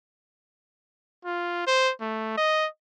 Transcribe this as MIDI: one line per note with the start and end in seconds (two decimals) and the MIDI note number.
1.25 1.64 65
1.67 1.92 72
2.01 2.33 57
2.37 2.67 75